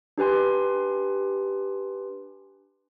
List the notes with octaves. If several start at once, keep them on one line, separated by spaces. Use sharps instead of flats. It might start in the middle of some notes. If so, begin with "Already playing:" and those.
D4 G4 B4 G#5 C6